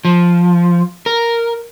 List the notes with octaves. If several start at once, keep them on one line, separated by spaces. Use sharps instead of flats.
F3
A#4